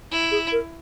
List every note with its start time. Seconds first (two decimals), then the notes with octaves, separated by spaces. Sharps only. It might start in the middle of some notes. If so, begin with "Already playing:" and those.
0.12 E4
0.31 G#4
0.52 A#4